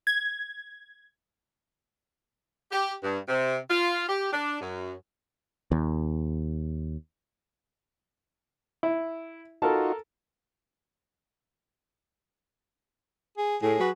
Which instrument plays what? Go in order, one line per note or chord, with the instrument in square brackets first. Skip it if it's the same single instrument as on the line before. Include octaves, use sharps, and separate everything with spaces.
[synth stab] G#6
[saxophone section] G4
G2
C3
F4
G4
D4
F#2
[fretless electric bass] D#2
[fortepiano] E4
[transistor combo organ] D#4 F4 F#4 [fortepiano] A4 A#4 A5
[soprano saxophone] G#4
[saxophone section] A2 [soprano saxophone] G#4
[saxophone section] F#3 F#4 B4